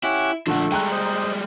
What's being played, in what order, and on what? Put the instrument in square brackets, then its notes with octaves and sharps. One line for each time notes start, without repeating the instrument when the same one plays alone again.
[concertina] C#4 G4 F#5 [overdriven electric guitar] E4
[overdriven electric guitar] A#2 F3 [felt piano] D3 D4 F#5 [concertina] A3
[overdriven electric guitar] G3 G#3 [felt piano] G5 A#5 F#6
[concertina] C5 D#5